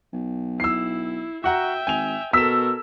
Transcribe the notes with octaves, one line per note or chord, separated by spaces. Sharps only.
B1
E4 E6 C7
F#4 E5 F#5 G5 A#5
G#1 G#5 F7
B2 A4 A#4 E6 B6 E7